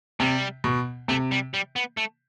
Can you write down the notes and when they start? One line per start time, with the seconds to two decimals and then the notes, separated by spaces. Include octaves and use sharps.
0.20 C3 G3
0.64 B2
1.08 C3 A3
1.31 G3
1.54 G3
1.76 B3
1.97 A3